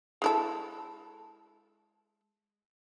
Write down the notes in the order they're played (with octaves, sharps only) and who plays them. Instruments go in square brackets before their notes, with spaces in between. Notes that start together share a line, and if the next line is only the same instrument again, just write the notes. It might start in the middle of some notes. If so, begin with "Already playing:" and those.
[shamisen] G#3 E4 A4